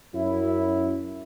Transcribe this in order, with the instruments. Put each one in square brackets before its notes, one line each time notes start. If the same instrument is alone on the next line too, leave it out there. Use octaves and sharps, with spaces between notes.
[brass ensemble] F#2 E4